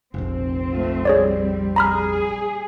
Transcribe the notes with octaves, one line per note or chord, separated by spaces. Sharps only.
F1 A#1 C4
A3 F4
G3 G#4 C#5 D5
G#4 A#5 B5 F6